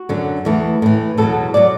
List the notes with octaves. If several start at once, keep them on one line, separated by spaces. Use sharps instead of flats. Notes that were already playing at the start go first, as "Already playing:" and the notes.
Already playing: F#4
F#2 D3 F#3
E2 E3 A3
A2 E3
E2 B2 F#3 A4
B2 F#3 D5